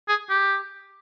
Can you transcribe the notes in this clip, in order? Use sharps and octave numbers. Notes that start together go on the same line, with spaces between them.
G#4
G4